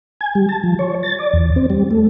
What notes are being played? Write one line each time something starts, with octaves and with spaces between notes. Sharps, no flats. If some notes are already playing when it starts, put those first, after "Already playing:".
G#5
G3
A5
F3
C#5
A6
D5
E2
C4
G3
A3